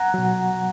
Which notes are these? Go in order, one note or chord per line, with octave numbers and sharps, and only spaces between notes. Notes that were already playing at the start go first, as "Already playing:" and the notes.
Already playing: F#5 A#5
B2 F#3